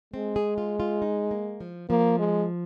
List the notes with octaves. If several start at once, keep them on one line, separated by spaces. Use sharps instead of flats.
G#3 C4
G#4
F4
F4
D#4
A#3
F3
F3 A#3
G#3